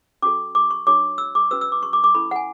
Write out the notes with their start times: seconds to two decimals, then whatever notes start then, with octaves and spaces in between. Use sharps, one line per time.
0.22 C#4 F#4 A4 D6
0.55 D6
0.71 C#6
0.87 D4 F#4 C#5 D6
1.18 E6
1.35 D6
1.51 C#4 F#4 B4 E6
1.61 E6
1.72 D6
1.83 C#6
1.93 D6
2.04 D6
2.15 C#4 E4 A4 B5
2.31 F#5
2.36 G#5